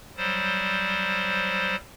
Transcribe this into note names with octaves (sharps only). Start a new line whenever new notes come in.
F#3 G3 C5